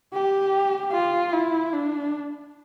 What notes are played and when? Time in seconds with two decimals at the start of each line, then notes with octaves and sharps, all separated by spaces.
0.13 G4
0.92 F4
1.33 E4
1.73 D4